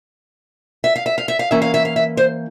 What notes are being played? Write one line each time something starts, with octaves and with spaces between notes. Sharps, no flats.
E5
F5
E5
F5
E5
F5
E3 A#3 C#4 E5
F5
E5
F5
E5
C5